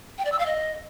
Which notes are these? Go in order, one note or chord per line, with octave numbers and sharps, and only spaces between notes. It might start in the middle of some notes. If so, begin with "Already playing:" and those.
G5
D5
E6
F5
D#5